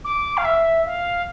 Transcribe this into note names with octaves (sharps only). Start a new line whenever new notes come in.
D6
F5
E5
F5